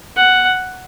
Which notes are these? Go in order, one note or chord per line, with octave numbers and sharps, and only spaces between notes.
F#5